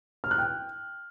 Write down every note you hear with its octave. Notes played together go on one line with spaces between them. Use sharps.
F6
F#6
G5